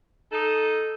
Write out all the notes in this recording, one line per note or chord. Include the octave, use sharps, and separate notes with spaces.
D#4 A4